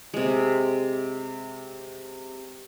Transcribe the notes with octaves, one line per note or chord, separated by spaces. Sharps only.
C3 G#3